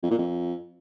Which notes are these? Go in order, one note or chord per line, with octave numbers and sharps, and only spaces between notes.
F2
A#2
F2